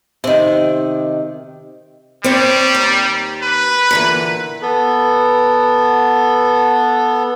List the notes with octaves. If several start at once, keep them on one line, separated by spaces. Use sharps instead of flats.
C3 D#3
G3 C4 C#5
D#2
B4
A#2 D3 E3
B3 A4